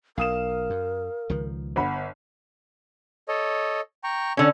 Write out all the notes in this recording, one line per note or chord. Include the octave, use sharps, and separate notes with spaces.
B1 A#4 F5 D#6 E7
F#2
C#2 D#3 F3
G1 F#5 B5
A4 C#5 D#5
G5 A#5 C#6
D3 C#4